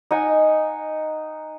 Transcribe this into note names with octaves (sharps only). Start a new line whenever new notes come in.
D#4 F#5 G#5